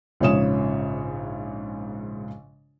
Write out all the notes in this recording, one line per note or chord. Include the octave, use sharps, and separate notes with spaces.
A#1 G#2 C#3 C#5 D#6 E7